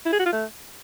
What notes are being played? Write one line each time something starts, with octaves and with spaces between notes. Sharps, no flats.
E4
G#4
F#4
F4
A3